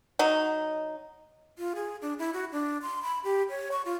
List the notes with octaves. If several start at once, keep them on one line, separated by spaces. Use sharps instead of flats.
F#3 D#4
F4
G#4
D4
E4
F#4
D4
C6
B5
G4
C#5
C#6
F4